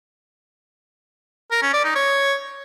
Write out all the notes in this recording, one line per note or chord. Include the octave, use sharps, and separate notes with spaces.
A#4
C#4
D5
D#4
C#5